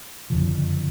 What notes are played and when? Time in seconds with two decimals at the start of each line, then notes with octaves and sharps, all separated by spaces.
0.30 F#1 F2 D3 F3